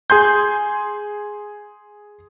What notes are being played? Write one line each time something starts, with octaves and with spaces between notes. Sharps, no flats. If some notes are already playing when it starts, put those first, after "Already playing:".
G#4 G#5 C6 G6